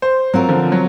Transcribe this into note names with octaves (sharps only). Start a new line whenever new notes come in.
C5
F#3 C4 F4 A#4
D3 F3
F#3